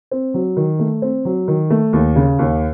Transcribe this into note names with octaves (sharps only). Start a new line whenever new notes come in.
C4
F#3
D#3
A3
C4
F#3
D#3
A3
D#2
C#3
D#2